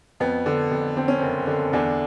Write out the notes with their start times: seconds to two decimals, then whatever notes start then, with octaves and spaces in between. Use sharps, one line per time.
0.20 F2 B3
0.46 D3
0.71 F2
0.97 D3 C4
1.08 C#4
1.19 F#1 C4
1.47 D3
1.73 E2 D3 D4